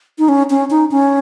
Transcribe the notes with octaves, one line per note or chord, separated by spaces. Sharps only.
D#4
C#4
C#4
D#4
C#4